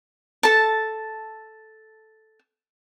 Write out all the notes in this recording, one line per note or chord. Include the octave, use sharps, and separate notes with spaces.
A4 A5